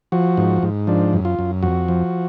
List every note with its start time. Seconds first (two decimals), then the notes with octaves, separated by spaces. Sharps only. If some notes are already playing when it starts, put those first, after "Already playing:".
0.12 F3 F#4
0.37 G#2
0.63 G#2
0.87 F3 D4
1.13 F#2
1.25 F4
1.39 F#2
1.63 F2 F#4
1.88 F3